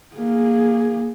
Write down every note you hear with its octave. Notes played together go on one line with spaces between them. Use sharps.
A#3 G#4